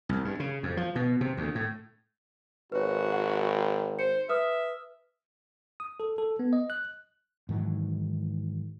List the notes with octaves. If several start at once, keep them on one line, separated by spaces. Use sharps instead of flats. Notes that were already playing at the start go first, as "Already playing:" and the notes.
C2
G2
C#3
F2
F3
B2
C3
D2
A2
G#1 F#4 B4 C#5
F#5
C5 C#7
B4 E5 D#6 F6
D#6
A4
A4
B3
D#5
F#6
G#2 D#3 E3 F#3